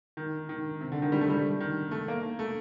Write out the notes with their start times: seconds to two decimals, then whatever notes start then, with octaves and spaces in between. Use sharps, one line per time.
0.17 D#3
0.49 D#3
0.81 C3
0.92 D3
1.02 D#3
1.12 G3
1.21 A3
1.30 G3
1.60 D#3
1.91 A3
2.08 A#3
2.39 A3